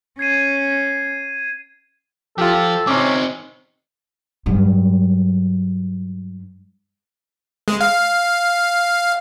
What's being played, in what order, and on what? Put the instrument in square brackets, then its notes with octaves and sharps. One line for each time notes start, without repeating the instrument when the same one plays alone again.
[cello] C#4 [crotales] G#6 C7 D#7
[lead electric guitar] F3 [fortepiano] F4 G4 [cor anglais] A4
[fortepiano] C3 D6 [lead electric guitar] C4 D#4 [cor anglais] C#4
[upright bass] G2 F#3
[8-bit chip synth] G#3
F5